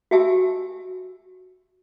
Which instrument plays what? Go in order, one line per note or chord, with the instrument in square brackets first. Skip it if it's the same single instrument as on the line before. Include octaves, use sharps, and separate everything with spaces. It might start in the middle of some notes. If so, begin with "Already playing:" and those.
[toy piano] F#4 G4 E5 G#5 A5 E6